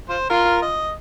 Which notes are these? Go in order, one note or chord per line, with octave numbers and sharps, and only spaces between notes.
F4 C5
F4 A#4
D#5